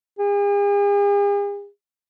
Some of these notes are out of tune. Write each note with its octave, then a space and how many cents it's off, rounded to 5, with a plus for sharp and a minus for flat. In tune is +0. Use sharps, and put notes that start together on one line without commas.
G#4 -45